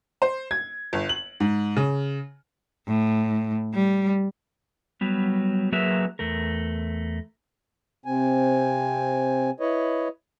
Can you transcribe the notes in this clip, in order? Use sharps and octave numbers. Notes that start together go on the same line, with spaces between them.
C5
G#6
G1
F#7
G#2
C#3
A2
G3
F#3 G3 B3
F#3 A#3 G#4 A#4 B4 E5
E2 A3 A#4
C3 C4 G#5
E4 B4 C#5 D#5